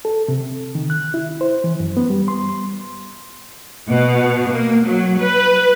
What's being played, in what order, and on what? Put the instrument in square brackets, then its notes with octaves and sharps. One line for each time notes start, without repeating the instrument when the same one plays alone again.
[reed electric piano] A4
C3
D#3
F#6
E4
C5
E3
F#2
B3
G3
C6
[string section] B2
A#3
F#3
B4